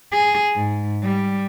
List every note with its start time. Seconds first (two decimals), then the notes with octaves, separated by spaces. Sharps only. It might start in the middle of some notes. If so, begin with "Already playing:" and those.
0.12 G#4
0.55 G#2
1.02 G3